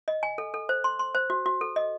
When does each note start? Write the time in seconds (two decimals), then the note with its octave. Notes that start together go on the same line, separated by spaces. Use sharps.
0.08 D#5
0.23 G#5
0.38 A4
0.54 A4
0.69 C5
0.84 C6
0.99 C6
1.15 C5
1.30 F#4
1.46 F#4
1.61 A4
1.76 D#5